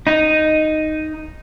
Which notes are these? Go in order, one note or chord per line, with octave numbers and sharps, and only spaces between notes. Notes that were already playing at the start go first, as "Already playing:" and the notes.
D#4